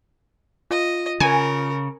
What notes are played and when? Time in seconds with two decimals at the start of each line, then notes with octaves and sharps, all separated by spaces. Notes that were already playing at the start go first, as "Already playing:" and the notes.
0.71 F4 D#5
1.20 C#3 A#4 G#5